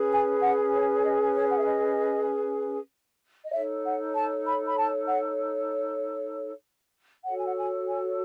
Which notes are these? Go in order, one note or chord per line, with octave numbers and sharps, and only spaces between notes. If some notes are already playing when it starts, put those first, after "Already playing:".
Already playing: C#4 G#4 B4
G#5
F#5
C#5
C#5
D#5
C#5
F#5
E5
D#5
D#5
D#4 A4 C#5 E5
F#5
A5
B5
B5
A5
F#5
F#4 A4 C#5 F#5
G#5
F#5
G#5
G#5